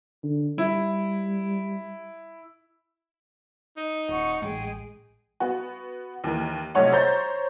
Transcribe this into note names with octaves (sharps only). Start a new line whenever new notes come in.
D3
G3 E4
D#4
D#1 F#5 C#6
A1 G#3 G#4 G5
B3 F#4
D#2 E3 A#4
B1 C3 A3 C#5 F#5
C5 C#5 A#5 G6 A6